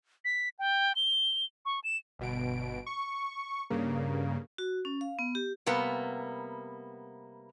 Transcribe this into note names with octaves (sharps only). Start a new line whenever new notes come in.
B6
G5
G7
C#6
E7
G1 B2 D7
C#6
G2 C#3 A#3
F#4
C#4
F5
B3
G4
C3 G3 A#3 B3